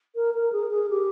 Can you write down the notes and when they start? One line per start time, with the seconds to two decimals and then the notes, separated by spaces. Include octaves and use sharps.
0.15 A#4
0.34 A#4
0.52 G#4
0.71 G#4
0.90 G4